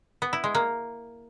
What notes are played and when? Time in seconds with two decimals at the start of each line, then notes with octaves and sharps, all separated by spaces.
0.22 B3
0.33 E4
0.44 G#3
0.55 A#3